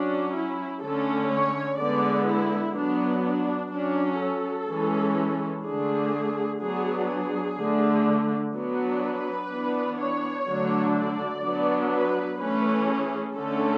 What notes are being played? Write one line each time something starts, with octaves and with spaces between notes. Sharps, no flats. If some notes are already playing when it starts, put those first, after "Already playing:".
Already playing: F#3 C#4 D4
E4
D3 A3 C#4 A4
C#5
D3 G#3 B3 D5
E4
F#3 B3 D4
D4
F#3 C#4 D4
A4
E3 G#3 C#4
D3 A3 D4 G#4
F#3 B3 D4 G#4
G#4
D3 A3 D4
F#3 B3 D4
B4
E3 B3 D4
C#5
D3 F#3 A3 D4
D5
F#3 B3 D4
B4
E3 A3 C#4 B4
G#4
D3 A3 C#4 A4